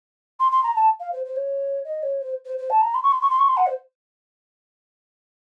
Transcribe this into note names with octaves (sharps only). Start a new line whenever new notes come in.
C6
C6
A#5
A5
F5
C5
C5
C#5
D#5
C#5
C5
C5
C5
A5
A#5
C6
C#6
C6
C#6
C6
C#6
C6
F#5
C5